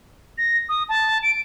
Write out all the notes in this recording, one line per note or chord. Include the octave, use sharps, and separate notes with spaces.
A#6
D#6
A5
D7